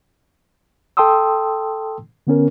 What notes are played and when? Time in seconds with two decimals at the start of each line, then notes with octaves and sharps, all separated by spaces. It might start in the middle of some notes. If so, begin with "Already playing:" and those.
0.97 A4 G5 A5 C6 D#6 E6
2.27 D3 B3 C#4 A#4